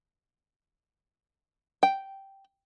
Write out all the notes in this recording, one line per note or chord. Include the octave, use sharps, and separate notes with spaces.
G5